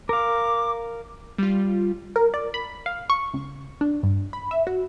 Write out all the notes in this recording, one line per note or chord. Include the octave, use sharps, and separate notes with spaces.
A#4 F5 D6
G3 F4
A#4
D5
B5
F5
C#6
C#2
D4
G2
B5
E5
F#4